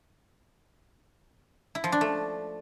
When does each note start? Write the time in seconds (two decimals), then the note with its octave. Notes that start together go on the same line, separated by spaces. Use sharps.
1.75 E4
1.84 F3
1.92 D4
2.01 A3